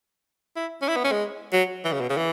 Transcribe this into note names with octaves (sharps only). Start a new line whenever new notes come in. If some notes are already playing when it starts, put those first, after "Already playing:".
E4
C#4
E4
B3
C#4
G#3
F#3
E3
C#3
B2
C#3
E3